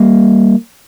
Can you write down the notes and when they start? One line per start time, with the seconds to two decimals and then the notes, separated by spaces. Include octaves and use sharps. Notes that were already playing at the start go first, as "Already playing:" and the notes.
Already playing: G3 A#3